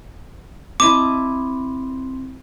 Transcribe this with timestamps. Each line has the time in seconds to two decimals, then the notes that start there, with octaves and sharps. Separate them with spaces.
0.80 C4 E4 D#5 A5 D6